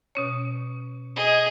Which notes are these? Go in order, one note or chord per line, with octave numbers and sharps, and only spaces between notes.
B2 C#4 C#5
G#4 D#5